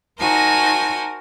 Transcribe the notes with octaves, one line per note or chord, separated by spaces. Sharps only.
D#4 F#4 A#4 C5 G#5 A5